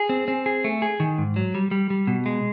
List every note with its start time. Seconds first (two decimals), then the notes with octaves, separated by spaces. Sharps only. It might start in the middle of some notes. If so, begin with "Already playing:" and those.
Already playing: G#4
0.09 C4
0.28 C4
0.46 G#4
0.64 A3
0.82 G#4
1.00 D#3
1.18 G#2
1.36 F#3
1.55 G3
1.71 G3
1.90 G3
2.07 B2
2.26 G#3